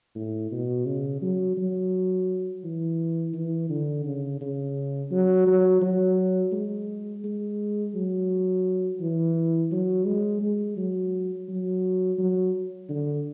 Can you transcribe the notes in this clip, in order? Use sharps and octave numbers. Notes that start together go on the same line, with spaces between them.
A2
B2
C#3
F#3
F#3
E3
E3
D3
C#3
C#3
F#3
F#3
F#3
G#3
G#3
F#3
E3
F#3
G#3
G#3
F#3
F#3
F#3
D3